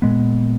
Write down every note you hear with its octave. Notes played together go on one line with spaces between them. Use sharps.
A#2 G#3 B3